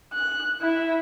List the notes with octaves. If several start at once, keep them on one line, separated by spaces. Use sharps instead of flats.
F#6
E4